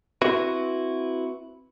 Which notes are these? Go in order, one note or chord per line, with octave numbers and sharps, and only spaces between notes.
C4 E4 F#4 B4